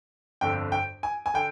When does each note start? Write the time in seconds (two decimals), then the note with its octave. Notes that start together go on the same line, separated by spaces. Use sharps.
0.41 G1 F2 D3 G5
0.72 G5
1.03 G#5
1.26 G#5
1.34 D3 G5